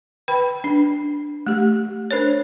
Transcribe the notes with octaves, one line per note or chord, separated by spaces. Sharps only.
B4 G5 B5
D4
A3 G4
D4 A#4 C5 C#5